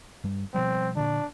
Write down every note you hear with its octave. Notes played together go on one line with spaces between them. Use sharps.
G2 G3
B2 F3 G3 C4
A#2 D3 D4